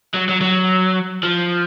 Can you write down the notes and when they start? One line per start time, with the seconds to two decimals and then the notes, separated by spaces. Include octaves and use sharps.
0.14 F#3
0.29 F#3
0.41 F#3
1.23 F3